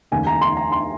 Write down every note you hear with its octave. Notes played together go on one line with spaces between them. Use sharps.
F1 D#2 C#3 G#5
A#5
C6
A#5
C6